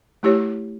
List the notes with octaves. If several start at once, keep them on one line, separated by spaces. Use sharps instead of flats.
A3 E4 G4 C#5